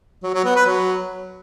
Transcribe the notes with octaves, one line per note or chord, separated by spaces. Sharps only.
F#3
F#3
B3
B4
F#3